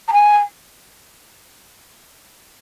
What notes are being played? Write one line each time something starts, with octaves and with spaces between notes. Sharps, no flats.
A#5
G#5